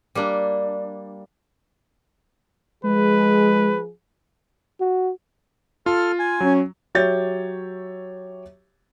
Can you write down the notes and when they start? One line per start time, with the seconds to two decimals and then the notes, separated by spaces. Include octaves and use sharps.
0.15 G3 A#3 D4
2.84 F3 G#3 G#4 B4
4.81 F#4
5.86 F4 A4 F6
6.19 G#5
6.41 F#3 C#4
6.95 F#3 G4 C#5 E5 G6 A6